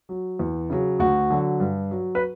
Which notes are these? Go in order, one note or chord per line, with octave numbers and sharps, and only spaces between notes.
F#3
E2
C#3 F#3
D2 F#4
D3 F#3
G2
F#3
B4